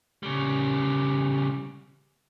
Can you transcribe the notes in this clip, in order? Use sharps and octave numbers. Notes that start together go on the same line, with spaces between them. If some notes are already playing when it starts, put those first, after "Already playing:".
C#3 G3